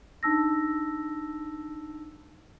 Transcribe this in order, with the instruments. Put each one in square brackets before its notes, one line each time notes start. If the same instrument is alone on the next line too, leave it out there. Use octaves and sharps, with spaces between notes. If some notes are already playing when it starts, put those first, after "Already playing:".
[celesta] D4 D#4 A5 E6 A#6